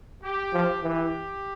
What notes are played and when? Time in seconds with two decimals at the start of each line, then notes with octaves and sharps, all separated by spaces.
0.23 G4
0.53 F3
0.83 E3 G4